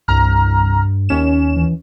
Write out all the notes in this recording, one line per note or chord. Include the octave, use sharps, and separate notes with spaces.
C2 G2 A#5 F6
D#2 C#4 E7
E3